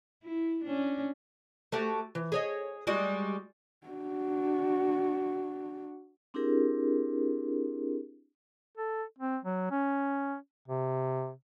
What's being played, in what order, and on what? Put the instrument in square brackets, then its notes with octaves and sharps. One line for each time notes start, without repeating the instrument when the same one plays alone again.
[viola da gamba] E4
C#4 D4
[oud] A3 F#4 G4
E3
G#4 C#5 D#5
G3 G#3 F#4
[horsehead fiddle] D4 F#4
[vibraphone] C4 D4 E4 G4 G#4 A#4
[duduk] A4
C4
F#3
C#4
C3